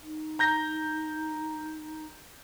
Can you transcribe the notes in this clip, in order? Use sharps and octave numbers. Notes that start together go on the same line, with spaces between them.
D#4
A#5 G6 A#6